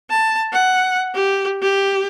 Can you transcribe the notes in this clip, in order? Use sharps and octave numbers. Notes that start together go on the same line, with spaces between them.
A5
F#5
G4
G4